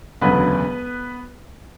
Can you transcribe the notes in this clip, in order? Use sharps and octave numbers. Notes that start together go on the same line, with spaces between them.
E1 D2 C#3 F#3 B3 B4